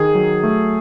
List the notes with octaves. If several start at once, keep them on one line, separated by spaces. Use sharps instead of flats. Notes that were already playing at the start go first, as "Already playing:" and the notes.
Already playing: D#3 G#4
F#3
A3